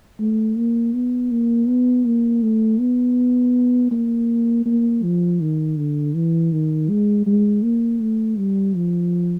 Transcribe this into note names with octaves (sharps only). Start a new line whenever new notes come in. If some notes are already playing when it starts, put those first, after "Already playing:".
A3
A#3
B3
A#3
B3
A#3
A3
B3
A#3
A#3
F3
D#3
D3
E3
D#3
G#3
G#3
A#3
A3
G3
F3